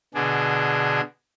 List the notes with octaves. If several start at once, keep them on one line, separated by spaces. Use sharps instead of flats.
B2 D3 D4 G#4